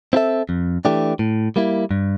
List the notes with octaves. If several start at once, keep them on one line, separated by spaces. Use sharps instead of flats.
C4 E4 A4 E5
F2
E3 A3 D4 G4
A2
G3 A#3 E4
G2